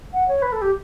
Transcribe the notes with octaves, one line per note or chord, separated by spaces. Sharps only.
F#5
C#5
B4
A4
G4